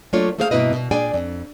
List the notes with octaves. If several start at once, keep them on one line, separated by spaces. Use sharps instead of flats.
F#3 A3 A#3 D4 F4 C#5
A3 A#3 G#4 C5 D5 F5
G2 B2 A#3 E4 B4 D#5
B2
A#2 D4 G#4 D5 G5 G#5
F2